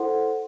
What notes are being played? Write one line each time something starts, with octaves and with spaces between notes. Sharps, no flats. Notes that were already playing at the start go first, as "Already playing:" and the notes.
Already playing: E4 A4 C5 F#5 C6